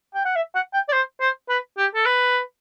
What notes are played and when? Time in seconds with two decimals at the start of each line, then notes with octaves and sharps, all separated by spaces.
0.14 G5
0.25 F#5
0.36 E5
0.55 F#5
0.74 G5
0.88 D5
0.93 C5
1.21 C5
1.49 B4
1.78 G4
1.95 A4
2.06 B4